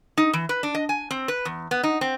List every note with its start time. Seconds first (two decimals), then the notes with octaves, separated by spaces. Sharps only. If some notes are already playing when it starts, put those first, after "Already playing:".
0.18 D#4
0.33 E3
0.49 B4
0.63 D4
0.75 D#5
0.89 G#5
1.11 C4
1.28 B4
1.45 E2
1.71 B3
1.83 D#4
2.01 C4